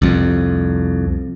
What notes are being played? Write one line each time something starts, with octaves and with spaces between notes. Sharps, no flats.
C2 F2